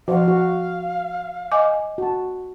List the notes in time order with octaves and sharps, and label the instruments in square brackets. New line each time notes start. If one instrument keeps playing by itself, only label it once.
[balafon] F3 [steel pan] F#4 C5 [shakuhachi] F5
[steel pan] F#4
[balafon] D#5 G#5 D6
[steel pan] F#4 A5